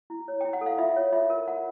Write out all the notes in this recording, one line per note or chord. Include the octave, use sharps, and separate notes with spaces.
E4
C#5
E4 G5
F#5
A4
F5
F4 E5
C#5
F4 E5
A#4
F4 F#5